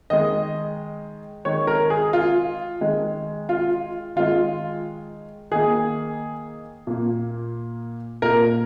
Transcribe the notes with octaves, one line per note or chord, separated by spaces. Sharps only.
D#3 G#3 D#5
D#3 G#3 C#5
A#4
G#4
F4
D#3 G#3
F4
D#3 G#3 F4
D#3 A#3 G#4
A#2 A#3
A#2 A#3 A#4